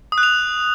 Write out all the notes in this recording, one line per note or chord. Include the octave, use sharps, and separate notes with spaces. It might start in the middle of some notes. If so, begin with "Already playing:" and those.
D#6
F#6
F7